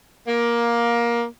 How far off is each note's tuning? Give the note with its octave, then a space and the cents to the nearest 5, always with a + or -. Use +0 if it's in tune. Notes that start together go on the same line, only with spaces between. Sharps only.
A#3 +15